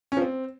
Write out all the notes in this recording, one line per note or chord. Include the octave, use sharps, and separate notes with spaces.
C#4
F3
C4